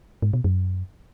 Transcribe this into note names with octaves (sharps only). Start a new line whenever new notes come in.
G#2
B2
F#2